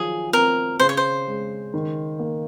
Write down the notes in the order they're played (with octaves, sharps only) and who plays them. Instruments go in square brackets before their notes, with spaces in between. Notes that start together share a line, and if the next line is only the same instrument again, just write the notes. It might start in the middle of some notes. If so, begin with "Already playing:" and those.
Already playing: [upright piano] D#3 F3 F#3 [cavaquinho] G#4
[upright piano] C4 [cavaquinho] A#4
[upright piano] C#3 [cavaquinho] C5
[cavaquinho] C#5
C5
[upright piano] G#3
D#3
A#3